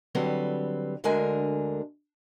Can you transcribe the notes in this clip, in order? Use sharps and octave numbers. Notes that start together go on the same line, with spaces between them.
D3 F#3 G3 C4 B4
D2 D3 G#3 D4 A#4 G#5